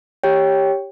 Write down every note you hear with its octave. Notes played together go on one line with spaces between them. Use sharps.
G4 C#5 G5